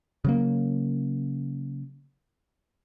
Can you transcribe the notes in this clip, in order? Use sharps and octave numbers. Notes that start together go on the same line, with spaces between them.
C#3 F#3 A#3